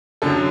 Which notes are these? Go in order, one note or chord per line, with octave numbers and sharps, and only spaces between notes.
F#2 D3 F#3 A4